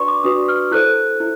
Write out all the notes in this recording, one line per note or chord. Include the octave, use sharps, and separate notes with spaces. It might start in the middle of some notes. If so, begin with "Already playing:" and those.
Already playing: D4 F#4 B4 D5 C6 C#6
D6
D4 F#4 B4 D5 D#6
F6
E4 A4 C5 F#6
E4